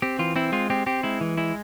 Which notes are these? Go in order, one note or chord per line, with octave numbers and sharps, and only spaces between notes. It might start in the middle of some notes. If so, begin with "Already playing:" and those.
C4 G4
E3 F4
C4 E4
G#3 F4
C4 G4
C4 G4
G#3 E4
E3
G#3 E4